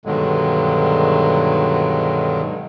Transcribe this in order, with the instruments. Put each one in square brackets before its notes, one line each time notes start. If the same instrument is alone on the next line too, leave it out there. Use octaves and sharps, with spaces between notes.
[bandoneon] G2 B2 D3 D#3 F#3 G#3